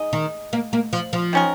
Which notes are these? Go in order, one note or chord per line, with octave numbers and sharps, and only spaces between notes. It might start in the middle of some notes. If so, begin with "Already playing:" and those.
Already playing: G#3 D#4 D#5
D#3
A#3
A#3
F3
F3
D#3 C#4 A#4